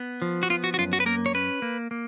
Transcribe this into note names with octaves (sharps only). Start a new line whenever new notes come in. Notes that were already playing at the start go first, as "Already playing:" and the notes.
Already playing: B3
F3
F#4
B3 F4
F#4
F#4
F#2 F4
F#4
B4
A#3 A#4
C#5
C#4 B4
A#3
A#3